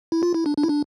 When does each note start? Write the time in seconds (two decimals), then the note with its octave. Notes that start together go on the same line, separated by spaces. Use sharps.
0.12 E4
0.23 F4
0.34 E4
0.46 D4
0.57 D4
0.63 E4
0.68 D4